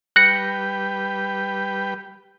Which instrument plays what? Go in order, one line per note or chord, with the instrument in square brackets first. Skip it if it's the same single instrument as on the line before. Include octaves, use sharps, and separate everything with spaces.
[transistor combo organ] G3 B4 G5 [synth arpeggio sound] F#6 A#6 C#7